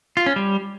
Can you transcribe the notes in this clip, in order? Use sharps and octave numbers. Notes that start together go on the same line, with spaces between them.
F4
C#4
G3